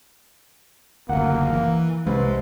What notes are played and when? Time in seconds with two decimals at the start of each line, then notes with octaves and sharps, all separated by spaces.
1.09 F#1 D2 A#3 F#5
1.52 E3
2.06 C2 G#3 B4